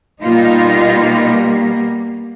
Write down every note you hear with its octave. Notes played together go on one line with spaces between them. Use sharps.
B2 G3 A#3 D#4 F4